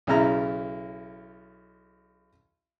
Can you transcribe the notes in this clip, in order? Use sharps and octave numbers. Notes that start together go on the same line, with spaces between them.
B1 C#3 E4 A#5